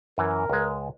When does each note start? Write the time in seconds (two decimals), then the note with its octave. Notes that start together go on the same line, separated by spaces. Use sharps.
0.18 F#2 E3 A#4
0.50 C#2 G#3